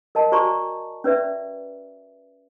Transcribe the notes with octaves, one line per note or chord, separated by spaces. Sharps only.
A#4 D#5 A5
F#4 C5 D5 G#5 A#5 C#6
C#4 B4 D5 E5